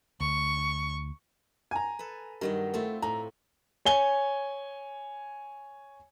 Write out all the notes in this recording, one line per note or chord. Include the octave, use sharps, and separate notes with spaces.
D2 C#6
G#5 A#5
A4 B4
G2 D#3 F#3 D#5
A3 C4 E4 F4
A2 A#5
C#5 G#5 G7